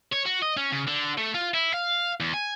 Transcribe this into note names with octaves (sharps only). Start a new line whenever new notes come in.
C#5
F#4
D#5
C#4
C#3
D3
A3
F4
E4
F5
E2
G#5